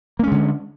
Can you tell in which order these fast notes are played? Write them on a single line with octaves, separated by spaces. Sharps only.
A#3 C#4 G#3 D3